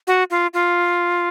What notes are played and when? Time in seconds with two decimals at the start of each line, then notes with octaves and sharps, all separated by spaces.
0.07 F#4
0.31 F4
0.54 F4